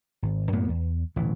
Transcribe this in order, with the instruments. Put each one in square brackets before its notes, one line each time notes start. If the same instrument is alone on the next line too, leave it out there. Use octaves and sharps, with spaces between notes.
[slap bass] G#1
F#2 A2 A#3 B3
E2
D1 A1 B2 E3